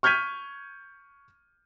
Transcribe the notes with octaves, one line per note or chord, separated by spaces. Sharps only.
C#6 F6 G6 G#6 B6 D#7